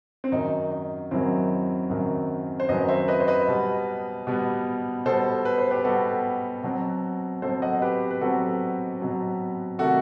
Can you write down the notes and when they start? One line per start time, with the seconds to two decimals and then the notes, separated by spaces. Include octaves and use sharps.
0.24 C4
0.32 F#2 D#3 F#3 D#4
0.71 D#4
1.11 F#2 D#3 F#3 C4 E4
1.90 F#2 D#3 F#3
2.60 C5
2.69 F#2 D#3 F#3 B4 D#5
2.88 C5 E5
3.08 B4 D#5
3.20 C5
3.28 B4 D#5
3.48 B2 G3 B3
4.27 B2 G3 B3
5.05 B2 G3 B3 A4 C5
5.45 B4
5.58 C5
5.71 G4 B4
5.84 B2 G3 B3 F#4 A4
6.63 B2 F#3 C4
7.42 B2 F#3 C4 A4 C5
7.62 D#5 F#5
7.82 G4 B4
8.11 B4
8.21 B2 F#3 C4 F#4 A4
9.00 B2 F#3 C4
9.79 C3 D#3 A3 F#4 A4